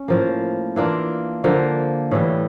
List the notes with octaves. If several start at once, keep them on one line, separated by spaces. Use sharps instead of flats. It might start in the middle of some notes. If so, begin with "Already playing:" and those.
Already playing: C#4
A2 F3 A#3
E3 A#3 D4 F4
D3 F3 A#3
A2 E3 G3